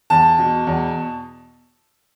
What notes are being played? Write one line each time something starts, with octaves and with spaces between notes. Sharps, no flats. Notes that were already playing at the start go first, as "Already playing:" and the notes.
E2 A5
B2
E2